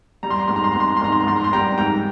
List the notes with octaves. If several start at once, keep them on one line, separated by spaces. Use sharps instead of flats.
G3 A#5
C6
A#5
G#2 C6
A#5
C6
G#2 A#5
C6
A#5
C6
G#2 A#5
C6
A#5
G#2 C6
A#5
C6
G3 G5 A#5
G#2 G5 A#5